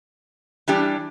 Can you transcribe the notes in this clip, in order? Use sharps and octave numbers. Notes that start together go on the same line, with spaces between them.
E3 G3 D4 G4